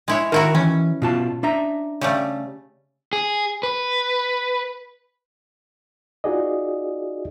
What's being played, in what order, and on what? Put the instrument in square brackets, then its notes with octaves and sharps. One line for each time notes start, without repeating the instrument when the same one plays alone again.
[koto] G#3 E4 C#5
[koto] D#3 E4 F#4 [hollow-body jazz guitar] A#4 A5 A#5
[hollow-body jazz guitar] E3 [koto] C#4
[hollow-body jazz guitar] B2 F4 A5
D4 E5 A#5
[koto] C#3 G3 A3
[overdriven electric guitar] G#4
B4
[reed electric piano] D#4 F4 F#4 G#4 D5 D#5